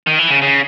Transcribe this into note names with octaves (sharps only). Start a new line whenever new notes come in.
D#3
E3
C#3
C#3